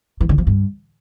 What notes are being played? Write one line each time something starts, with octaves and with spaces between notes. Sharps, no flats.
E3
D3
F3
G2